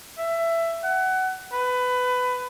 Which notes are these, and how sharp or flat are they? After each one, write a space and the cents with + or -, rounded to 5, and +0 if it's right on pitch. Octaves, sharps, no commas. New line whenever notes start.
E5 +15
F#5 +25
B4 +20